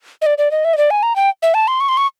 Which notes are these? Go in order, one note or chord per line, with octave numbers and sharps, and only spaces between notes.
D#5
D5
D5
D#5
E5
D#5
D5
G#5
A#5
G5
E5
A5
C6
C#6
C6
C#6